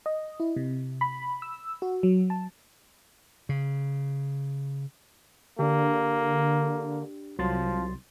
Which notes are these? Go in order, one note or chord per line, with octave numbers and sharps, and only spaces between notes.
D#5
E4
C3
B5
E6
F#4
F#3
A5
C#3
D3 A#3 D4 G4
C2 F3 F#3 C6 A6